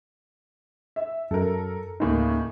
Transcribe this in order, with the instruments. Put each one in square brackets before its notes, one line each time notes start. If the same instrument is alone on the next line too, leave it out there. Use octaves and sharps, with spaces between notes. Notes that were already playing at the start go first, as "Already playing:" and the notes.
[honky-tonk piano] E5
[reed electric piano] F#2 [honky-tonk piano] A4 A#4
[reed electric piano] D2 A#3 D#4 [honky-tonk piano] A2 C#3